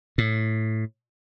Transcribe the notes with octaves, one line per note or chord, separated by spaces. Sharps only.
A2